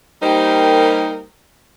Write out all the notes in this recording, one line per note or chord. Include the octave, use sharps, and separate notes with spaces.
G3 A#3 D#4 G4 A#4 C5